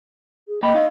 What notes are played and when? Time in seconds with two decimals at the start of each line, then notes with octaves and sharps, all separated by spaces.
0.48 G#4
0.63 A#3 D#5 G5 B5
0.75 D#4 F5